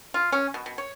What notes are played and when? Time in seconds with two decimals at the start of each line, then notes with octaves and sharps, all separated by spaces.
0.14 F4
0.32 C#4
0.54 B2
0.66 B2
0.78 C#5